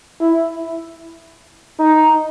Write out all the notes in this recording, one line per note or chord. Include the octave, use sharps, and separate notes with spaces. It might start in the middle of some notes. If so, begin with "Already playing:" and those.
E4
D#4